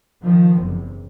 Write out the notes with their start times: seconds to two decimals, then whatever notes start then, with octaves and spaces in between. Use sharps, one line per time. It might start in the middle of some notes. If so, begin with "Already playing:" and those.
0.24 D#3 F3
0.58 F#1 E2 C3